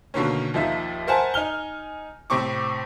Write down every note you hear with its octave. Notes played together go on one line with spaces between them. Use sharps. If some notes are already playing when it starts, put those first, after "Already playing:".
B2 D3 D#3 A#3 C#4
D#2 F3 D#4 E5
A#4 C5 E5 F#5 G#5 A5
D#4 G#5 F6 G7
A2 C3 C4 C#6 D6